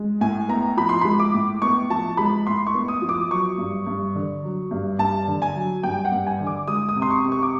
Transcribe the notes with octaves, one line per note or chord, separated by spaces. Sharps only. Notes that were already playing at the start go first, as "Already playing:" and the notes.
Already playing: G#3
A2 G#5
B3 A#5
F3 B5
C6
G#3 B5
D6
A2
B3 C#6
F3 A5
G#3 B5
A2 C6
C#6
B3
D#6
F3
D6
F#3 C#6
G2
G2
D3
F#3
G2
G2 A5
D3
G#5
F#3
G2 G5
F#5
G2
G#5
D3
D6
G#3 D#6
D#6
C3
C6
C#6
C3
C#6
D6